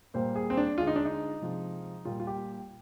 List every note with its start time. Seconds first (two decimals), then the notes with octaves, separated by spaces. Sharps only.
0.14 A#2 G3 A#3 C5
0.36 G#4
0.50 C4
0.57 D4
0.78 D3 G#3 F4
0.87 D#4
0.96 D4
1.05 D#4
1.42 C3 F3 G#3
2.05 A#2 G3 A#3 F4
2.20 F4
2.27 G4